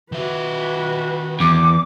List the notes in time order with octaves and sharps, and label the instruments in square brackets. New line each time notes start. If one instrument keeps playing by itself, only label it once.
[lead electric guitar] D#3 E5 [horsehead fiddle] F#4 B4
[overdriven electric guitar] E2 [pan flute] D6